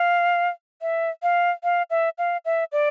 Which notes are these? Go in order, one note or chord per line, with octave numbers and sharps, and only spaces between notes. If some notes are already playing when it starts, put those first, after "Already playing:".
Already playing: F5
E5
F5
F5
E5
F5
E5
D5